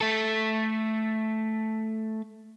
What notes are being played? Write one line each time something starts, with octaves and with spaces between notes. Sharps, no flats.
A3 A4